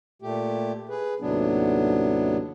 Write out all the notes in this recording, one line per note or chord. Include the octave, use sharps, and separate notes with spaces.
A#2 A3 G4
G#4 B4
D#2 A2 C3 F#3 B3 D4